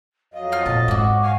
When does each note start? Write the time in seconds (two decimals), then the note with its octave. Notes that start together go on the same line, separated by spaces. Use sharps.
0.34 F2 F#3 D#5 F5
0.52 F4 F6
0.66 A#2 A5
0.88 G#2 C#4 F#4 D6
1.22 F5 G#5 C#6